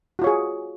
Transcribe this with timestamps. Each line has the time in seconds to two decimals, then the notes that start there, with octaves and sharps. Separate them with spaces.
0.19 F#4
0.22 F4
0.24 C#5
0.27 G#4